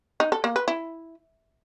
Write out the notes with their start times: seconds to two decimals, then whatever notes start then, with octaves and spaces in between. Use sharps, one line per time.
0.20 D#4
0.32 A4
0.44 A#3
0.56 B4
0.68 E4